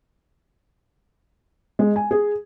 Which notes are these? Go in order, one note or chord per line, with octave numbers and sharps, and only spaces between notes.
G#3
G#5
G#4